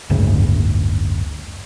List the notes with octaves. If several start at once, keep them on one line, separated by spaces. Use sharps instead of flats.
F#1 D2 G#2 C#3